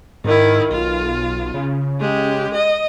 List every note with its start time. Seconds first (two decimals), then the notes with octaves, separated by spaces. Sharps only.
0.24 G#2 D#3 E4
0.71 B1 F4
1.54 C#3
2.00 G#3 G4
2.54 D#5